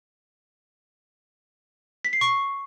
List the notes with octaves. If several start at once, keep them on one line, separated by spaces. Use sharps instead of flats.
B6
C7
C#6